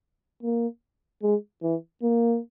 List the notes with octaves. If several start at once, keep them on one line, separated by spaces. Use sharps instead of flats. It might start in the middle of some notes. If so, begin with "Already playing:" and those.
A#3
G#3
E3
A#3